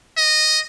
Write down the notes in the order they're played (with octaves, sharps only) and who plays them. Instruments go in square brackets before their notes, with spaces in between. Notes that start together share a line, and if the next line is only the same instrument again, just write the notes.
[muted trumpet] D#5